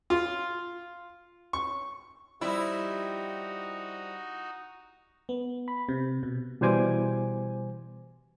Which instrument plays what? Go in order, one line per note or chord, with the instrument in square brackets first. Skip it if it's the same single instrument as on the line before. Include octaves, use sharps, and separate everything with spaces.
[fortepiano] F4
C#6
[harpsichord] F3 G3 [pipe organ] D#4 F#4 [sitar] E4 [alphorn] G4
[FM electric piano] B3
B5
C3
B2
[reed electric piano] B2 E3 G3 C5 G#5 D6